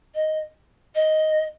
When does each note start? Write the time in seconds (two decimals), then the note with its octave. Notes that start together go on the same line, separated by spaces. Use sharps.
0.15 D#5
0.95 D#5